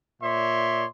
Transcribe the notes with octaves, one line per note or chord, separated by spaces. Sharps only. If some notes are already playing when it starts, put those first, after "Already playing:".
A#2 C#5 D5 E5 C6